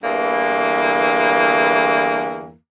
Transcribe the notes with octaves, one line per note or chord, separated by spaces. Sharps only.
E2 G2 D3 E3 A#3